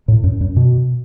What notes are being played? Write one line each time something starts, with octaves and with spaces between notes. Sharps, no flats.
A2
F#2
F#2
B2